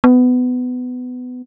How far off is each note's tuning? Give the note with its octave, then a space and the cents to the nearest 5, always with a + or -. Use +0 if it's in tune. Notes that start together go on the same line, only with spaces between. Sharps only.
B3 +20